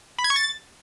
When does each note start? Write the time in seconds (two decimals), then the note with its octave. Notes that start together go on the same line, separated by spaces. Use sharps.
0.18 B5
0.24 G#6
0.30 C#6
0.36 A6